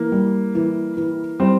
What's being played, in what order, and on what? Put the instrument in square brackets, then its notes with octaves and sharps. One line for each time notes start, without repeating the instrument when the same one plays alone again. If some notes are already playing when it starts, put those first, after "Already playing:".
Already playing: [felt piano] E3 [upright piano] A#3
[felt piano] G3
E3
E3
[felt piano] G3 [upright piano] C4